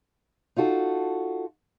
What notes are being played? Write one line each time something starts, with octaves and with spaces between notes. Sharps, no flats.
D#4 F4 F#4 A4